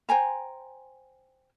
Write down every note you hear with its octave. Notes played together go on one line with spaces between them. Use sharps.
C5 G5 G#5 A#5